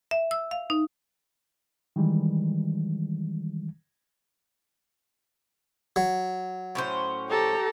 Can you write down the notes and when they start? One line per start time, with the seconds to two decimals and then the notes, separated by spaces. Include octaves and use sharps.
0.11 E5
0.31 E6
0.51 F5
0.70 D#4
1.96 D#3 E3 G3 G#3
5.96 F#3
6.75 A2 C#4 C5
7.30 G4 A4 A#5